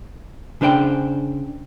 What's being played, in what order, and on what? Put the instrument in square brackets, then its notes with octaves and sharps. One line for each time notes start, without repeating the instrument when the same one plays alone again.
[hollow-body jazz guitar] C#3 D4 C5 D5 G5